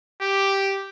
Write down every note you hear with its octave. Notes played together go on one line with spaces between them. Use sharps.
G4